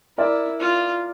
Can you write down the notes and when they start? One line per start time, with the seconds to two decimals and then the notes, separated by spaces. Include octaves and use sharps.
0.18 E4 A#4 D5
0.60 F4